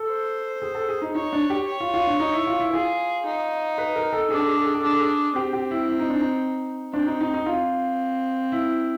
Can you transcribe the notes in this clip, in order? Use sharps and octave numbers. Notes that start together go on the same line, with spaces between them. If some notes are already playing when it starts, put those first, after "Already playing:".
Already playing: A4
C5
G#4
A4
G#4
D#4
D#4 C#5
D4
G4
C#5
F4
F4
D4
D#4
E4
F4
E4
F4 G#4
D#4
B4
A#4
A4
D4 G#4
A4
G#4
A4
G#4
A4
D4 G#4
A4
G#4
C4 G4
G4
E4
E4
D#4
D4
D#4
C4 D4
D#4
D#4
D#4
C4 F4
E4